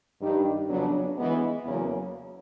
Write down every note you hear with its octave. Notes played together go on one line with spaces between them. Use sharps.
G2 D#3 G3
F2 C#3 F#3 B3 D4
E3 G#3 B3
E2 C#3 F#3 A#3